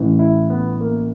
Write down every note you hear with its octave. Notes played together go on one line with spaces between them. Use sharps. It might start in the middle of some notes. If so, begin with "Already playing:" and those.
Already playing: A1 A2 E3
E4
B3
A#3